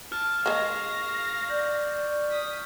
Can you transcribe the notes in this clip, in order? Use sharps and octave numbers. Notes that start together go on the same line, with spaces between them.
A5 F6
G#3 A#3 F5 C#6 A#6
D5 G6 F#7
D#6 B6